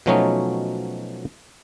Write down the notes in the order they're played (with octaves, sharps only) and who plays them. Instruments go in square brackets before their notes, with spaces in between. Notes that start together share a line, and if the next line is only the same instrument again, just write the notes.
[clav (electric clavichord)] B2 F3 F#3 A3 C#4 D#4